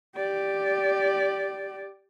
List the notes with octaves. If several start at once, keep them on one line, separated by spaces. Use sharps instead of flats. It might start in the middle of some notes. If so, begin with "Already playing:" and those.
G4 D5